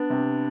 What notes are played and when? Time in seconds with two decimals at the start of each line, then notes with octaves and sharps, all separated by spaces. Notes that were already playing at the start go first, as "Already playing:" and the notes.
Already playing: B3 D4
0.10 C3